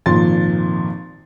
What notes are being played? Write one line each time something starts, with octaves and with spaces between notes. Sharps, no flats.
G#1 F2 A#2 C6 A6